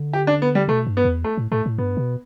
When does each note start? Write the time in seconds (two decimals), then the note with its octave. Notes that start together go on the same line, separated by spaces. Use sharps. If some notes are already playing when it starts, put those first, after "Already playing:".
Already playing: D3
0.13 G4
0.27 D4
0.42 B3
0.55 G3
0.68 B2 A3
0.87 G2
0.97 B3
1.05 E2
1.24 A3
1.38 A2
1.52 A2 A3
1.66 A2
1.78 G2 B3
1.97 B2